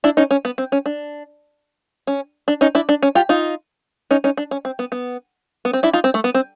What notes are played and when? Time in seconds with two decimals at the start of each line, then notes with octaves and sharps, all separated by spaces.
0.04 D4 E4
0.17 C#4 D#4
0.31 C#4
0.45 B3
0.58 C4
0.72 C#4
0.86 D4
2.07 C#4
2.48 D4
2.61 C#4 D#4
2.75 D4 E4
2.89 D4
3.02 C#4
3.15 F4 G4
3.29 D#4 F4
4.11 C#4 D#4
4.24 C#4 D#4
4.37 D4
4.51 C#4
4.65 C4
4.79 B3
4.92 B3
5.65 B3
5.73 C4
5.83 D4 E4
5.93 D#4 F4
6.04 C4
6.14 A3
6.24 B3
6.34 C4